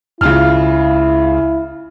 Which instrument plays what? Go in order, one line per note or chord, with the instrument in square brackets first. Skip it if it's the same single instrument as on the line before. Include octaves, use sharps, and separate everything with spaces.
[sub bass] C#2 [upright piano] C#3 F4 F6 [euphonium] E4